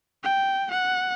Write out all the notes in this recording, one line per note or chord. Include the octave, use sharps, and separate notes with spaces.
G5
F#5